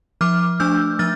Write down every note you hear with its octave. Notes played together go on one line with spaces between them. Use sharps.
F3 D6 F6
A3 D4 E6 G6
F3 F6 A6